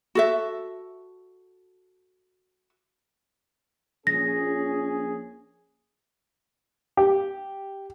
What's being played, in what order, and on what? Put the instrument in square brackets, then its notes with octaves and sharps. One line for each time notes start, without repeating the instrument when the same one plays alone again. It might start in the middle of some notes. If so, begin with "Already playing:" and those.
[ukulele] F#4 A4 E5
[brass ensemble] A#1 C#4 G#4 [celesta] A#6
[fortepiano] G4